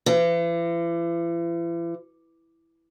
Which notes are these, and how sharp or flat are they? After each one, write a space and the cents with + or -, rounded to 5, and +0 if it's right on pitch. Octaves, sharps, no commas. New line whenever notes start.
E3 +40